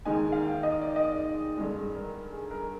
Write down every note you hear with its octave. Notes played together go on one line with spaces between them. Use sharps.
D#2 D#3 G#3 D#4 G#5
F5
G5
D#5
D5
D#5
D5
G2 D3 G#3
A#4
G#4
A#4